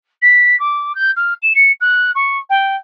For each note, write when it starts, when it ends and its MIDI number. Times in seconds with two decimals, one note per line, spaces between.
0.22 0.58 95
0.60 0.95 86
0.95 1.11 91
1.17 1.34 89
1.43 1.53 100
1.55 1.72 97
1.81 2.11 90
2.15 2.38 85
2.50 2.76 79